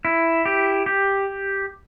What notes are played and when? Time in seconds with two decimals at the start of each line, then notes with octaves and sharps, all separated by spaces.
0.05 E4
0.46 G4
0.86 G4